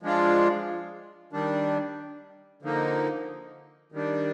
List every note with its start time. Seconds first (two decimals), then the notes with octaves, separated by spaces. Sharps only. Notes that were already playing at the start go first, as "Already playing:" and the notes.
0.02 F3 G#3 D4 F4
1.33 D#3 G3 D4
2.62 D3 F3 A#3 D#4
3.92 D#3 G3 D4